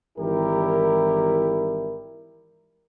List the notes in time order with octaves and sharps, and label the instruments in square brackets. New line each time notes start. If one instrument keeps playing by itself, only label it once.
[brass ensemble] G#1 E3 G3 E4 G4 A#4